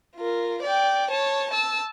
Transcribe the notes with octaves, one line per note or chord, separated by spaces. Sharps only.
F4 A#4
D5 G5
C#5 A5
A5 E6